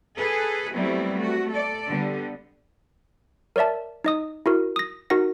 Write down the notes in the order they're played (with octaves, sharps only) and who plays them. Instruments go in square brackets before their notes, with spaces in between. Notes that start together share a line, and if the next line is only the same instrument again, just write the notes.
[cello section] G#4 A4 B4
F#3 G3 A3 B3 C4 E4
A3 F#4
A4 D5
D3 G3 B3
[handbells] A#4 C#5 D5 E5 A5
D#4 D#5 D#6
E4 F#4 A#4
D#6 A#6
D#4 F#4 A#4 F#5 A#6